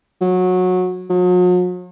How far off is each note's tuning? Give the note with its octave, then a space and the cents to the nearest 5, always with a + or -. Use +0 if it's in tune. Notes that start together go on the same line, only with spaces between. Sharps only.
F#3 -20
F#3 -45